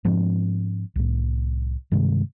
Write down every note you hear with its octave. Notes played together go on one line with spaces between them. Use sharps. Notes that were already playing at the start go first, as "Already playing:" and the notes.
G#2 F3 C4 D4
C2 A2
G2 C3 D#3 G#3